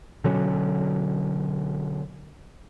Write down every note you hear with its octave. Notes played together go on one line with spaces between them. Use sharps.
B2 D3 F#3 C#4